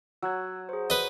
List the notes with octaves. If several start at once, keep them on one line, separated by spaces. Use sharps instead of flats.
F#3 E6 F#6 G#6
G#4 C5
B4 D#5